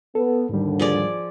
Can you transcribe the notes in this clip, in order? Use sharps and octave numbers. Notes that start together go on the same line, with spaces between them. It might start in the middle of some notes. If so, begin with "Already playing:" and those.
B3 A4
D#2 G#2 D3 G3
F3 G#4 D5